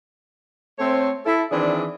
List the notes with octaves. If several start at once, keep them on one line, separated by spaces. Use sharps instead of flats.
A3 C4 C#5
E4 A4
D#3 E3 C4 D4 G#4 D5